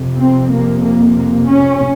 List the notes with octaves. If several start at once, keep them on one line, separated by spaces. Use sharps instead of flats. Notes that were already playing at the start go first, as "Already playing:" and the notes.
Already playing: F2 C3
C4
A#3
A#3
A#3
C#4